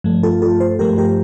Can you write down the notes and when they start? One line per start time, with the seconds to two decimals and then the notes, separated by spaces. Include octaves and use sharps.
0.04 G2 F3 A3
0.23 F4 A4
0.42 F4 A4
0.60 A4 C5
0.79 G2 F3 A3 G4 A#4
0.98 G4 A#4